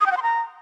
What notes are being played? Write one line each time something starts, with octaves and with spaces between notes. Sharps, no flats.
D#6
G5
F#5
C6
A#5